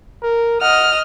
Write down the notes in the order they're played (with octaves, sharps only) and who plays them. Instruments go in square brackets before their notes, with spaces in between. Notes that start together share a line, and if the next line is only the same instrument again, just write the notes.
[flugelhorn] A#4
[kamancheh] D#5 F6 [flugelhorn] F#5